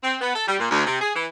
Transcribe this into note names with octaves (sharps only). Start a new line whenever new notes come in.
C4
B3
A4
G3
A#2
D2
C3
G#4
E3